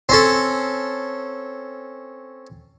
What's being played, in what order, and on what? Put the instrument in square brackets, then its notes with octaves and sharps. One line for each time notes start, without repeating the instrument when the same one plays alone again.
[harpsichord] C4 C#4 A4